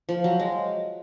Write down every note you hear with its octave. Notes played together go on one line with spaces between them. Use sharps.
F3
F#3
G#3